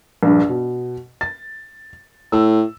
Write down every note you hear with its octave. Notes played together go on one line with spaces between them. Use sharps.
A#1 G2
B2
A6
A2 E6